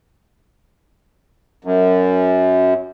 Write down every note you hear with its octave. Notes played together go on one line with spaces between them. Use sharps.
F#2